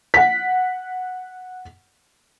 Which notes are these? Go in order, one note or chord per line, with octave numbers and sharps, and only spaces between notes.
F#5 B6